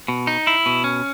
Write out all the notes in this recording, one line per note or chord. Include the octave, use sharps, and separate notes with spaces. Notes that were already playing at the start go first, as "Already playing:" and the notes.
B2
D#4
E4
B2
C#4